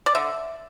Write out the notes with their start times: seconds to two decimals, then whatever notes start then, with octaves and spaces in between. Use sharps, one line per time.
0.06 D5
0.15 D3 E5